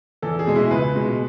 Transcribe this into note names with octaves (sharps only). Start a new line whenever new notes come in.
E2 A4
G#4
B2 G#3
E4
C#2 B4
B2 G#3